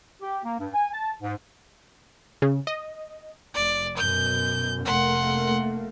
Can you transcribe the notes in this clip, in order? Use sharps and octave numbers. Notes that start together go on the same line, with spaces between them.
G4
A#3
G2
G#5
A5
G#2
C#3
D#5
F1 D5
F#2 B2 G6
F1 A3 A#3 F#5 C6